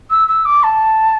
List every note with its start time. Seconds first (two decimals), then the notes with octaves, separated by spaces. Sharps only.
0.11 E6
0.28 E6
0.45 D6
0.63 A5